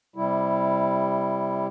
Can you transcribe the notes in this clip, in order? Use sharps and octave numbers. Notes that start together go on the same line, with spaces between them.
C3 G3 E4